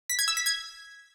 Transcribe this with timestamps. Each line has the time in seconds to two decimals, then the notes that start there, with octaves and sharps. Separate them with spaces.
0.10 B6
0.19 G#6
0.28 E6
0.37 B6
0.46 G#6